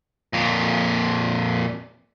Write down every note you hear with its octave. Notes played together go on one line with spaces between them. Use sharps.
F2 A#2